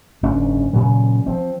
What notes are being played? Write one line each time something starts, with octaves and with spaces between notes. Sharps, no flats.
F#1 G#2 C#4 D4
A#2 C#3 E3 F#3
F3 C4